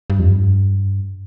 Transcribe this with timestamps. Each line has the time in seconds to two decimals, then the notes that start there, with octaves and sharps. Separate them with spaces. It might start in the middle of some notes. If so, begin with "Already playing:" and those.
0.10 G2
0.19 F2
0.30 G2